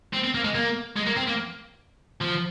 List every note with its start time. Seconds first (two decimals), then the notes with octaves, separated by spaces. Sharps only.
0.13 C4
0.24 C4
0.35 A#3
0.44 G#3
0.55 A#3
0.97 G#3
1.07 A#3
1.17 C4
1.28 A#3
2.21 F3